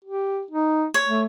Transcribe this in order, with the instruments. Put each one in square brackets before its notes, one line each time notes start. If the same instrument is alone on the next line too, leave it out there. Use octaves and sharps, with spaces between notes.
[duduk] G4
D#4
[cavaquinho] C#5
[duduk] A3